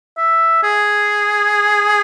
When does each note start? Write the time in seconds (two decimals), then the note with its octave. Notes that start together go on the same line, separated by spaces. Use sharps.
0.17 E5
0.63 G#4